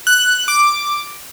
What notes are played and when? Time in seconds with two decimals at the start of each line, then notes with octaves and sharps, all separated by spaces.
0.07 F#6
0.48 D6